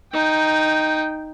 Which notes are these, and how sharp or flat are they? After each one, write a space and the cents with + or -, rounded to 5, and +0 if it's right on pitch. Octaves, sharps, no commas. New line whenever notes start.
D#4 +0 G5 +0